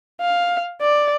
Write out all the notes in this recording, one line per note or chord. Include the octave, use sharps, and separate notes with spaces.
F5
D5